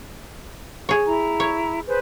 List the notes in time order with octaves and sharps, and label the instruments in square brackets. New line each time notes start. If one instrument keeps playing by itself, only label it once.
[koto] G#4 C#5
[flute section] E4 A#5
[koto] C#5
[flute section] G#4 B4 C5